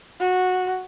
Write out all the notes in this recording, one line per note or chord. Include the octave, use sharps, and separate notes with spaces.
F#4